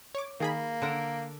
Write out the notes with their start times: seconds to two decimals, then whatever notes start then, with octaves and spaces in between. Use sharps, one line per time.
0.15 C#5 D6
0.40 D#3 A#3 G#4 B5
0.82 D3 D4 A#4